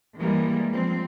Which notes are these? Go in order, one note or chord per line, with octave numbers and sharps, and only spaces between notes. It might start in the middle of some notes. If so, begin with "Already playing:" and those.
E3 G3 G#3 A#3
F3 C4